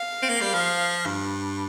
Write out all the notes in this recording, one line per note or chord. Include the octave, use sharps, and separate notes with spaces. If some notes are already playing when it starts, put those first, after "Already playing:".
Already playing: F5
C4
A#3
G3
F3
G2